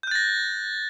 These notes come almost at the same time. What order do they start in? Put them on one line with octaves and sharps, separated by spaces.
G6 F#6 A6 A#6